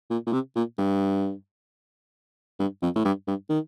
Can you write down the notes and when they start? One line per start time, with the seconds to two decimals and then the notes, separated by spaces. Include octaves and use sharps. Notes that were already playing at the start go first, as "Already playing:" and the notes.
0.10 A#2
0.27 A#2
0.33 C3
0.56 A#2
0.79 G2
2.60 G2
2.82 F2
2.96 A2
3.05 G2
3.27 G2
3.50 D#3